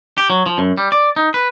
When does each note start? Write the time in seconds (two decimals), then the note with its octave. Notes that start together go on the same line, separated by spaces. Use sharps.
0.18 G4
0.30 F#3
0.46 F3
0.58 F#2
0.78 G3
0.92 D5
1.16 D#4
1.34 B4